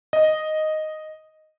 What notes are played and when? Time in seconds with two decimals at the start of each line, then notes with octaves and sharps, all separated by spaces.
0.13 D#5